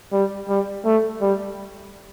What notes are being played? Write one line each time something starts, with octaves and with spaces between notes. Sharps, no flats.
G3
G3
A3
G3